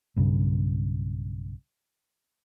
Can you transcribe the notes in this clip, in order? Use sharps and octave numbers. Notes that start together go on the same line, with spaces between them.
B1 G2 C#3